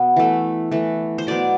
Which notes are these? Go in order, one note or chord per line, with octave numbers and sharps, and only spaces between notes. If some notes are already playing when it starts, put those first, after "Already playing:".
Already playing: B2 B3
E3 A3
E3 A3
C5
B2 F#3 B3 D5